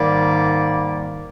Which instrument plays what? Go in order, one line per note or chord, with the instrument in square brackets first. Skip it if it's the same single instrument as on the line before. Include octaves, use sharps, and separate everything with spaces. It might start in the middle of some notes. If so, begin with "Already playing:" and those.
Already playing: [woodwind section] G#2 D#3 G3 A#3 D5